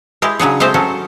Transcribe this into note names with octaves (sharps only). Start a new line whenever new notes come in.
G#3 E4 G4
C#3 F#3 D4 G#4
G#3 A3 C4 G4 C5
F#3 C#4 A4